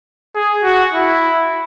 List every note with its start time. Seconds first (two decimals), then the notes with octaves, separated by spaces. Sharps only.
0.35 G#4
0.63 F#4
0.94 E4